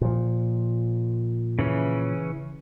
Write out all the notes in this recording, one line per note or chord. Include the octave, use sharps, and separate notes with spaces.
A#2 F3
C#3 E3 C#4